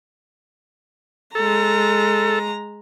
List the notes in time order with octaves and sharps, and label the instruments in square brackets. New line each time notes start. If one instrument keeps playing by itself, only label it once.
[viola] G#3 A#5 [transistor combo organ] A4